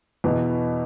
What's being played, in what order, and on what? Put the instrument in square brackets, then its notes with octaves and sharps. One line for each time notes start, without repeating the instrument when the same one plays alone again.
[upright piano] E2 B2 B3